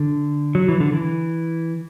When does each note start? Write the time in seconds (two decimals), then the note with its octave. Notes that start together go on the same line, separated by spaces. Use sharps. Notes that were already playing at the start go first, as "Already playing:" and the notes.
Already playing: D3
0.55 F#3
0.68 E3
0.80 D3
0.93 E3